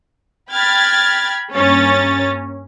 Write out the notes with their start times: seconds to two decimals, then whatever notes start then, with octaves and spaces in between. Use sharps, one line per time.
0.52 G5 B5 F6 G#6 A6
1.54 G2 A#3 C#4 C#5 A6